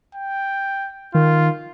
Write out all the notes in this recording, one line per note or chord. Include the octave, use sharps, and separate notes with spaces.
G5
D#3 F4